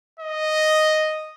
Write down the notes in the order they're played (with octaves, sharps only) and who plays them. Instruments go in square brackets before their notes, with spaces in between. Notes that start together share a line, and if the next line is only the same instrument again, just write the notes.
[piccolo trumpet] D#5